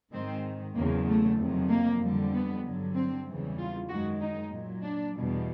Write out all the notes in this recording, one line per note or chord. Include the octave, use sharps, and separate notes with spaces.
G#2 D#3 G#3 C4
E2 C#3 F#3 A#3
A3
F2 C3 D#3 F#3
A#3
F2 D3 G3
B3
G2 D3 F#3
C4
E2 C#3 E3 G3
F4
F#2 D#3 G#3 F#4
D#4
A#2 F#3
D4
E2 B2 G3